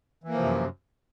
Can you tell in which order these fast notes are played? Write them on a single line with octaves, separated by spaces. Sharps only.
E3 A#3 F3 C3 F#2